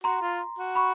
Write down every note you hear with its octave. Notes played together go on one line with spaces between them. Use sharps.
F#4 A#5 C6
F4
F#4
B5 C#6